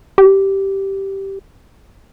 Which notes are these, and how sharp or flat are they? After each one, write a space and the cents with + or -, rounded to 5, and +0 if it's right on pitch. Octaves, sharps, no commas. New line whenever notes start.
G4 -10